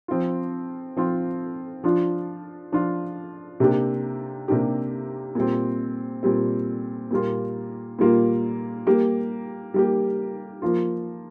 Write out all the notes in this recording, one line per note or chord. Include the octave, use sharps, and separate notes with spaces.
F3 C4 F4
F3 C4 F4
F3 D4 F4
F3 D4 F4
C3 A#3 D4 G4
C3 A#3 D4 G4
A#2 G3 C4
A#2 G3 C4
A#2 G3 A#3 F4
A#2 G3 A#3 F4
G3 A#3 G4
G3 A#3 G4
F3 A#3 F4